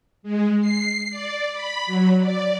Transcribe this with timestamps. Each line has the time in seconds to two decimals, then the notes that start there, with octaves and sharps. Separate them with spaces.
0.23 G#3
0.61 C7
1.10 D5
1.53 B5
1.86 F#3
2.21 D5